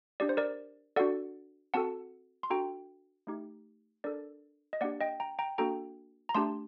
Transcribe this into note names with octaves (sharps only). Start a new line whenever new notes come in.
D4 G4 D5
C5
A#4 D5
D4 F#4 A4 D5 F#5
C4 F#4 A4 F#5 A5
C6
D4 F#4 A4 G5 A#5
A3 D#4 G4
D4 A4 A#4 D5
D#5
A#3 D4 G4 D5 F#5
D#5 G5
G5 A#5
G5 A#5
A#3 D4 F#4 A4 G5 A#5
A#5
A3 D4 G4 A5 C6